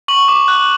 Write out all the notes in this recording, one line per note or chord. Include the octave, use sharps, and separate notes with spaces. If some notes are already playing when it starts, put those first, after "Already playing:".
C#6 F#7
D6
F#6